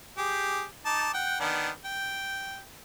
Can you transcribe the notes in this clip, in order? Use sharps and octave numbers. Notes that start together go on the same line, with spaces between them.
G4 G#4
D#4 A5 D6
F#5 G5
D#3 B3 D4
G5